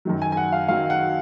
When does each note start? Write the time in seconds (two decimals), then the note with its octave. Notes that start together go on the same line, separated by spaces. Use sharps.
0.05 F#2 D#3 F#3
0.22 G#5
0.32 G#5
0.37 F#5
0.53 F5
0.68 F#2 D#3 F#3 F5
0.90 F#5